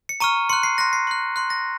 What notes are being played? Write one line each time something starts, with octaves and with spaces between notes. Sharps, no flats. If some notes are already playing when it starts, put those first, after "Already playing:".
C#7
A#5 C#6 F6 D#7
C6 F#6 C#7
C7
C6 F#6 A#6
C7
C6 F#6
C6 F#6
A#6